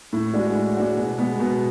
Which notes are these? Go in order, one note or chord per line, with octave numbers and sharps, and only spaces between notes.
A2
G#3 D4 F#4
A2
G#3 D4 F#4
B2
G#3 B3
B2